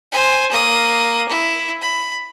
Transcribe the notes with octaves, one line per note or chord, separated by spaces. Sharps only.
C5 G#5
A#3 D#6
E4
B5